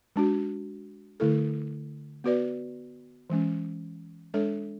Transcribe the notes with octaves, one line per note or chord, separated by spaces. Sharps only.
G#3 D4 F#4
D3 A3 E4 A4
B3 F#4 B4 D5
E3 G#3 C#4
G#3 D4 A4 C#5